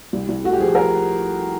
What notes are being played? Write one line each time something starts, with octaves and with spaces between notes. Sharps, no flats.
C2
C2
A3 F#4
G4
F3 G#4
A4
A#4